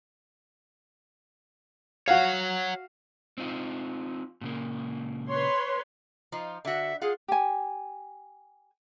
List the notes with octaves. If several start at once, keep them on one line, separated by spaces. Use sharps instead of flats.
F#4 C#5 F5 F#5
C4 D#4 F4
A#2 C#3 A#3
B4 C#5 C6
F3 D#4 F4
D3 F#4 E5
F4 G#4 F5 F#5
G4 G#5